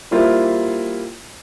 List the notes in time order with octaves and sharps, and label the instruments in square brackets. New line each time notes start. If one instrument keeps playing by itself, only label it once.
[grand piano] G3 A#3 E4 F4 A#4 C5